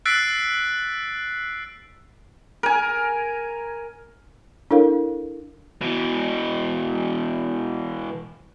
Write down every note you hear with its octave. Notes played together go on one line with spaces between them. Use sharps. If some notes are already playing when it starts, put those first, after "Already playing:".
E6 F#6 A6 B6 C7 D7
A#4 G#5
D4 E4 A4 A#4 C#5 F5
B2 E3